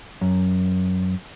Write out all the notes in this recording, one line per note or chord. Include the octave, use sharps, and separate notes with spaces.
F#2